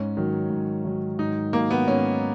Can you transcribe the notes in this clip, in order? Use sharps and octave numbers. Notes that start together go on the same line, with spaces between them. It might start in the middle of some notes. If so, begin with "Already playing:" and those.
Already playing: G#2 C#4
D#3 F#3
G#2
D#3 F#3
G#2 D#4
D#3 F#3 A#3
B3
G#2 C#4